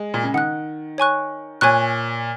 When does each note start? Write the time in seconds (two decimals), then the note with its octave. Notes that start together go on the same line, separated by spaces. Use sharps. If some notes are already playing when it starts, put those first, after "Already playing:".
Already playing: G#3
0.14 A#2
0.24 C#3
0.34 D#3 F#5 D#6 F#6
0.98 C#5 G#5 C#6 F#6
1.61 A#2 C#5 G#5 C#6 F#6